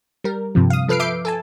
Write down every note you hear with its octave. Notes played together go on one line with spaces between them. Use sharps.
G3 A#4
G2 C3 F3
F5 D#6
F3 A4 B4 F6 C7 D7
E5 D6 G6 C7 D7
A4 G#5 A5